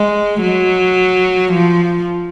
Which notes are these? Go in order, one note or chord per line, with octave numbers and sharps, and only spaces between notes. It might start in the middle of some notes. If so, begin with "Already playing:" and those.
Already playing: G#3
F#3
F3